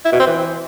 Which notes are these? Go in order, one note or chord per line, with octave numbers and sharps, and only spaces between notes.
E4
B2
C4
E3